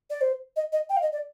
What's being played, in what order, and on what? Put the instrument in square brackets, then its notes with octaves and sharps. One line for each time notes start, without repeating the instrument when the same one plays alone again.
[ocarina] D5
C5
D#5
D#5
G5
F5
D#5
D5